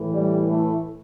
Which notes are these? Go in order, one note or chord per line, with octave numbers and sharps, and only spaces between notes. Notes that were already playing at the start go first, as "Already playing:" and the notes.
Already playing: A2 E3
G3
A3